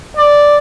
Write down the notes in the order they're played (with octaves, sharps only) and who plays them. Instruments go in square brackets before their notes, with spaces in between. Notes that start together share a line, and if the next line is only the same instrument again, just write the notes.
[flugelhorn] D5